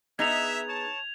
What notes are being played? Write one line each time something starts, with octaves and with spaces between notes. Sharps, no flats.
B3 D#4 G#4 E5 G#6 F7
C#5 A5